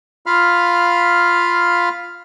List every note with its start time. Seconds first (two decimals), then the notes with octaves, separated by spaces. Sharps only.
0.26 F4 F5 B5 F6